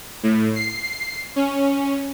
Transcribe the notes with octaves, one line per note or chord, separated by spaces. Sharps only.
A2
C7
C#4